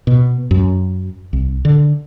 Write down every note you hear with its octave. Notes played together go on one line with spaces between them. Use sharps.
B2
F#2
C2
D3